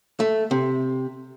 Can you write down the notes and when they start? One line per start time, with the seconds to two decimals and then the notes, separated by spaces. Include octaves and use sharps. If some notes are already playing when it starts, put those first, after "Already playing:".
0.20 A3
0.51 C3